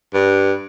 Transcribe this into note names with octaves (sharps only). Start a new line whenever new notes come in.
G2